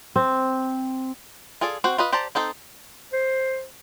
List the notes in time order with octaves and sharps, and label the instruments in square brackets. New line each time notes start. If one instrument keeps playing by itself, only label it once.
[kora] C4
[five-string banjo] F4 G#4 A4 D5
C4 F#4 C5
F4 B4 D#5
G4 C5 D5 A5 A#5
C4 D#4 A4 C5
[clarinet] C5